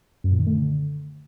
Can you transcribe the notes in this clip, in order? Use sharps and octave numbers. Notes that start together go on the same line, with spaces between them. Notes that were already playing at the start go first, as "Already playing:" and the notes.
F#2
A#2
D#3
A3
D3